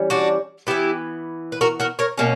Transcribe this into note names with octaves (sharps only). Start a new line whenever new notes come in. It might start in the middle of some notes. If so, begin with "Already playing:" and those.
Already playing: E3 G3 C#4
D4 F#4
E3 B3 E4 G4
B4
F#4 A#4
F#4 A#4
A#4 C#5
B2 A#3 C#4